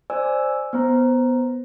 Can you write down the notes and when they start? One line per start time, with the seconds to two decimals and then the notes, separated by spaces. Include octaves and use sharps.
0.10 C5 D5 G#5 E6
0.73 B3 C5 A#5